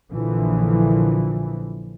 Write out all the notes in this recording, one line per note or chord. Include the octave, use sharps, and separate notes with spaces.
A#1 A#2 D3 E3 F3